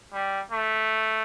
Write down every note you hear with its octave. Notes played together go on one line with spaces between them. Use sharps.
G3
A3